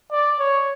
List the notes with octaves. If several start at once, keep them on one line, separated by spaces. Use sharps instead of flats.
D5
C#5